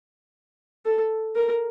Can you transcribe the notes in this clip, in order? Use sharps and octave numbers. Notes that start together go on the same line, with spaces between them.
A4
A#4